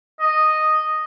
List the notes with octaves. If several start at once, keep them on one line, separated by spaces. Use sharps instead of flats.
D#5